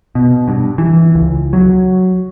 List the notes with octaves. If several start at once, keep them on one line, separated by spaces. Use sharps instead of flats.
B2
G2
E3
C#2
F#3